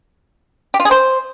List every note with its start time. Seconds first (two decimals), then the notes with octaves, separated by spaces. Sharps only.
0.74 G4
0.80 F4
0.85 G#4
0.91 C5